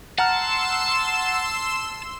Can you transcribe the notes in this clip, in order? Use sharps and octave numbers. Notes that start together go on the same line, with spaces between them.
F#5 A5 A#5 C6 E6 F6 E7